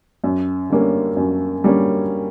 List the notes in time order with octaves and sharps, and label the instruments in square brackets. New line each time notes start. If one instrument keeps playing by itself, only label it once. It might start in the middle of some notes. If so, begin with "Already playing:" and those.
[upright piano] F#2
D3 G3 A#3 C#4
F#2
D3 G3 A#3 C#4